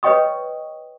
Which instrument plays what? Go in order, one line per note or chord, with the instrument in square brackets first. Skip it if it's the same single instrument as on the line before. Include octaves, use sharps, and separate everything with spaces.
[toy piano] B4 C#5 D#5 G5 C#6 D#6